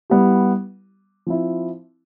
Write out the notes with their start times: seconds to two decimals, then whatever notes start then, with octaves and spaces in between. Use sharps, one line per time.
0.10 G3 B3 E4 G4
1.27 F3 C4 E4